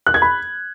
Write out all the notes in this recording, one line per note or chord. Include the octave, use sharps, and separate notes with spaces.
F#6
G#6
B5